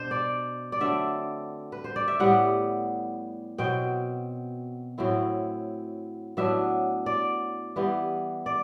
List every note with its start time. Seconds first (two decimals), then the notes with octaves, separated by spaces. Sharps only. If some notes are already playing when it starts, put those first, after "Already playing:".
Already playing: B2 D4 C5
0.11 D5
0.72 D5
0.80 D3 F#3 A3 C4 E5
1.72 B4
1.84 C5
1.96 D5
2.08 E5
2.20 A2 G3 B3 F#5
3.58 B2 F#3 C4 G5
4.98 A2 F#3 C4 E4
6.37 A2 F#3 B3 D4 E5
7.06 D5
7.76 E3 G3 B3 E4
8.46 D5